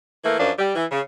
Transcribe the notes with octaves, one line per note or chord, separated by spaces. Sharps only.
E3 A3 A#3
F#2 F3 D4
G3
E3
C#3